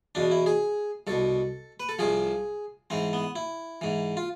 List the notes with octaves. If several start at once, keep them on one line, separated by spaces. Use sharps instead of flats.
E2 B2 D4
E4
G#4
C2 B2 A4
B4
A4
C2 C3 F3 G#4
G#2 E3 C4
B3
E4
G#2 E3
F4